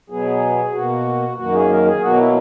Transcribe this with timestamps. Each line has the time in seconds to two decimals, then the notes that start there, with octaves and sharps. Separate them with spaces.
0.10 B2 F#3 B3 G#4
0.73 B2 A#3 F#4
1.37 F#2 D#3 A#3 F#4
1.53 G#4
1.70 A#4
1.85 G#4
2.01 B2 F#3 A#3 F#4
2.17 E4